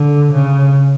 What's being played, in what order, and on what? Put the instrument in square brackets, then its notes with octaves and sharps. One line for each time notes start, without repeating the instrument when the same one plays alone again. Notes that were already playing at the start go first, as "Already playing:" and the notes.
Already playing: [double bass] D3
C#3